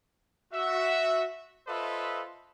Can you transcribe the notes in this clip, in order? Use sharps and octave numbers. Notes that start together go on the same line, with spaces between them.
F#4 E5
F4 A4 B4 C5 D#5 E5